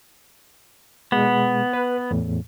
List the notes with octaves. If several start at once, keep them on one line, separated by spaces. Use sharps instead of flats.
B2 G#3 B3
B4
E2 A2